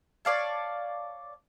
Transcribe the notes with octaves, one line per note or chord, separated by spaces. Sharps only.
C#5 D5 F5 A5